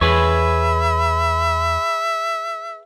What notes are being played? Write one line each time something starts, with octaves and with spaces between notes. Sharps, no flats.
E2 G#4 B4 C#5 E5 B5